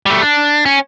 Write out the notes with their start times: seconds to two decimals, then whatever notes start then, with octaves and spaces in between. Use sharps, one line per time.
0.06 G3 A3
0.22 D4
0.66 C#4